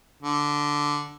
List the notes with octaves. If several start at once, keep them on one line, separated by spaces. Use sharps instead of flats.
D3